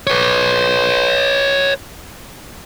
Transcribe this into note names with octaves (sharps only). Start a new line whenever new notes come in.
B4 C#5